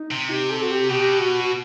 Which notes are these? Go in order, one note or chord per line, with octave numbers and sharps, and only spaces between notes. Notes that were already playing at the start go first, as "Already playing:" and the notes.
Already playing: D#4
C3
G4
A4
F#4
G4
B2 G4
F#4
F#4